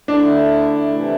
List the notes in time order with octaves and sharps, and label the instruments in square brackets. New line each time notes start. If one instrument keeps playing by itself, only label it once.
[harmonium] D3 A3 E4 [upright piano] D4
[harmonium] C3 E3 A3 E4